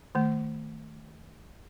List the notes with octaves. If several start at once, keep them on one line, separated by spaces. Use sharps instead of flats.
D#3 A3